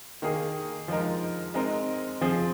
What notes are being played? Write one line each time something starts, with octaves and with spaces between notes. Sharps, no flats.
D#3 A#3 G#4
F3 G#3 D#4 A#4
G#3 C4 D#4 A#4
F3 C4 G#4